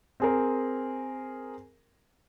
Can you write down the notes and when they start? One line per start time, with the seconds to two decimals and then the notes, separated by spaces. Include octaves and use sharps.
0.20 C4 G#4 A#4